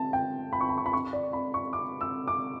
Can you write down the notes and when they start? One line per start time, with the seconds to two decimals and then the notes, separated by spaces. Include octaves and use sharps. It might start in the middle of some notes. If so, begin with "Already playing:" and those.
Already playing: A5
0.13 G5
0.53 B5
0.61 C#6
0.69 B5
0.78 C#6
0.86 B5
0.93 C#6
1.13 D5
1.33 B5
1.54 C#6
1.73 D6
2.01 E6
2.28 D6